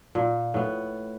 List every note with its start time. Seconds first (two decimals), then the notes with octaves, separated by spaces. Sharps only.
0.15 A#2
0.54 A2 B3